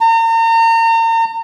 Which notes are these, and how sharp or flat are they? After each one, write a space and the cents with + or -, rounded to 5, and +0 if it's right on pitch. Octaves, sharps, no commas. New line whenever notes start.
A#5 -40